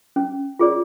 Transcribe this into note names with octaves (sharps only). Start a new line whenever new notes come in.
C#4
F4 G#4 D5